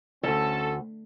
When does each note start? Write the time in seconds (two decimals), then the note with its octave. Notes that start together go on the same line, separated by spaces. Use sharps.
0.23 D2 G2 C#4 A4